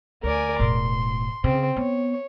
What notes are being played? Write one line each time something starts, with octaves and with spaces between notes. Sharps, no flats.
D2 A#4 D5 G#5
E1 A2 C6
C#3 C4
B3 C#5